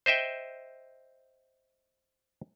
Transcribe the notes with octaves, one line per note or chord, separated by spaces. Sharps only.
C5 D#5 E5 G5